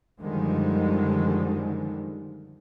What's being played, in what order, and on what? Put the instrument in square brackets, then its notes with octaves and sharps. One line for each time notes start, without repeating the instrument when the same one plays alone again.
[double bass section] F#2 D3 D#3 F3 G3 G#3